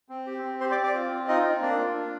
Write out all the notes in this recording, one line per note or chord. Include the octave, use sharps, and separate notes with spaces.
C4
G4
C4
G4 C5 C6
D5 D6
C4
D5 D6
F4
C4
D#4 F4 D#5
C4
A#3 D4 D5
F4
D4